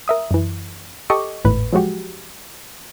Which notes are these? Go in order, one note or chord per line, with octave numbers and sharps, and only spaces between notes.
A#4 E5 D#6
F#2 E3
G4 A4 D#5 C#6 D6
G#1 E2 A2 B4
F3 F#3 G#3 F#4 G4